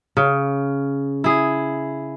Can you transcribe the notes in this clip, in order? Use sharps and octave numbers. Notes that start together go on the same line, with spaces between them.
C#3
E4 G#4